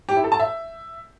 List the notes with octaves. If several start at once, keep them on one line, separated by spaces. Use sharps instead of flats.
G4
E4
A4
A5
E5